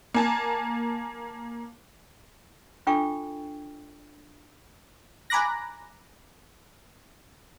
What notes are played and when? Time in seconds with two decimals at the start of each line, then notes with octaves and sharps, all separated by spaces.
0.14 A#3 G#5 A5
2.87 D4 F4 A4 G5 C#6
5.30 G#5 A#5 B5 D6 F#6 A#6